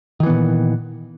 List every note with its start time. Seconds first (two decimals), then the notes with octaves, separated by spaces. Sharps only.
0.20 D#3
0.23 E3
0.26 B3
0.30 A#2